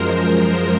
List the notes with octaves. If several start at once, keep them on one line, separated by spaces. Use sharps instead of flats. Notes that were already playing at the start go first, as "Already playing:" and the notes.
Already playing: F#2 F3 G#3 A#4 C5